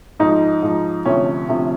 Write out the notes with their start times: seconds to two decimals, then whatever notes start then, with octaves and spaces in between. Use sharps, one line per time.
0.20 G#2 F3 D#4
0.62 G#2 F3
1.05 D2 C3 F3 C#4
1.48 D2 C3 F3